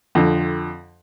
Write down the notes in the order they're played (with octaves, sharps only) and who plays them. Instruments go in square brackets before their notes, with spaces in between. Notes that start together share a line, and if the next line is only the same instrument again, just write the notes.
[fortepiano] F2 D3